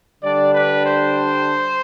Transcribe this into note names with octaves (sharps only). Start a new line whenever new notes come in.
D3 G3 D4 D5
B4
C5